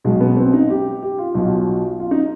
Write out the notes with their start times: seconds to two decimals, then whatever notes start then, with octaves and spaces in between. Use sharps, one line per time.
0.04 B1 B2 G#3
0.21 B3
0.37 C4
0.53 D#4
0.70 G4
1.03 G4
1.19 F4
1.35 B1 B2
2.00 F4
2.11 D#4